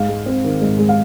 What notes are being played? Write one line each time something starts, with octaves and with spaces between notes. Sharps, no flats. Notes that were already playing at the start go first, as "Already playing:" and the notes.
Already playing: G#2 F5
G#3
C4
D#3
G#2
G#3
F5